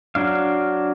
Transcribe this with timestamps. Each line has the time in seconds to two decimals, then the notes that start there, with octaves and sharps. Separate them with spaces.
0.15 F#3 D4 F5